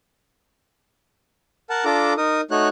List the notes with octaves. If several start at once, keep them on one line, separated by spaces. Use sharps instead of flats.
A#4 F#5 A5
D4 F4 A4 A#5 D6
D#4 A#4 D#6
A3 D#4 F#4 C#5 F#6